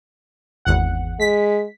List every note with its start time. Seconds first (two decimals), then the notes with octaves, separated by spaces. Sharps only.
0.65 G#1 E2 F#5
1.20 G#3 B6